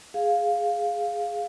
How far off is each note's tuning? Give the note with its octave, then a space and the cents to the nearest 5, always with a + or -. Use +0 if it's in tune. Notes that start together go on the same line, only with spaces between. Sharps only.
G#4 +0 F5 +0